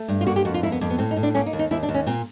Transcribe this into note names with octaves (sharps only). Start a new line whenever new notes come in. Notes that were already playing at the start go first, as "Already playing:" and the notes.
Already playing: A3
G2
F4
A#3 F#4
G4
F2 F#4
F4
A#3 E4
B3
F2 A#3
B3
A2 C4
D#4
A2
D4
A#3 C#4
D#4
D#2
D#4
D#2 E4
D4
D#2
C#4
A#2 C4